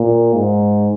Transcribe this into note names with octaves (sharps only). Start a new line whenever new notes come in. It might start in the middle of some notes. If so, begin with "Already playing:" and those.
Already playing: A#2
G#2